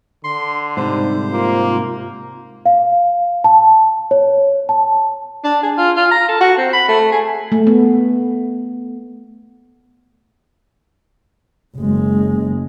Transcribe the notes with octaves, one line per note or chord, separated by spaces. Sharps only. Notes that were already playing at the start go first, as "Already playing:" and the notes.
D3 C6
G#2 C3 G3 D#4 C5
A#3 F4
F5
A5
C#5
A5
D4
G#4
F4
F4
A#5
A4
F#4
C4
B5
A3
G#4
A3
B3
F#1 G#3